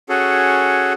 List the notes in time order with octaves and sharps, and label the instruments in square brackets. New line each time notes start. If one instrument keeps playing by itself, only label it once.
[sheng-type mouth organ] C#4 F#4 G#4 A4